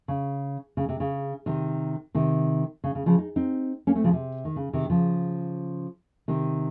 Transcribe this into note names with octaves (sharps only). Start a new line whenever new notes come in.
C#3
C#3
C3
C#3
C3 D#3
C3 D#3
C#3
C#3
C#3 F3
D#4
C4 D#4
A#3 C#4
A3 C4
C#3 F3
C3
D#3
C#3
C3 D#3
C#3 F3
C3 D#3